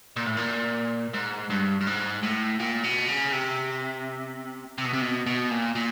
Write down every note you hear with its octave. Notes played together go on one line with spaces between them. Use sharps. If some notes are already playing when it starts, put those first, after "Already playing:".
A#2
A2
A#2
G#2
G2
G2
G#2
A2
A#2
B2
C#3
C3
C3
B2
C3
B2
B2
A#2
A#2